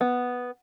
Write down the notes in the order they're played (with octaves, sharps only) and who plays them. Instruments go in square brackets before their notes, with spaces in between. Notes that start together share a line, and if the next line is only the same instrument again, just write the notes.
[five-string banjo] B3